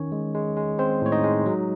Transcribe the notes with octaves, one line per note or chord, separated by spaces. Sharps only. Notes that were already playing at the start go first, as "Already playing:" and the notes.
Already playing: D#3 C#4 C#5
G#3
G#3
G#3
G#3 C4 C5
A2 C#5
D#4 D#5
G#3
F#3